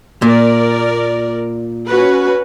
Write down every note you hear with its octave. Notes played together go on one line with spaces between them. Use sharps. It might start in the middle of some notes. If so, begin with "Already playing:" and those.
A#2 A#4 D5
C#4 F#4 B4